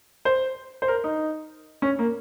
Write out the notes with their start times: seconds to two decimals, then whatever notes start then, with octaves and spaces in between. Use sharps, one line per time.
0.25 C5
0.82 C5
0.88 A#4
1.04 D#4
1.82 C#4
1.99 A#3